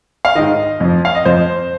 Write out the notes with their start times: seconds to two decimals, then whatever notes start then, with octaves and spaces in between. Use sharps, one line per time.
0.25 F5
0.35 G#2 D#3 D#5
0.80 F2 F3
1.05 F5
1.15 D#5
1.25 F2 F3 C5